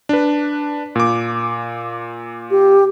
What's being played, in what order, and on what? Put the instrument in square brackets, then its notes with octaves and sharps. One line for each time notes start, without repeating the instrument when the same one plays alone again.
[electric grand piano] D4 B4
A#2 D6
[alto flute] G4